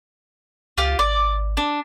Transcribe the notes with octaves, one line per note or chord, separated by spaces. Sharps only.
C#2 F4 G4 F5
G#1 D5
D4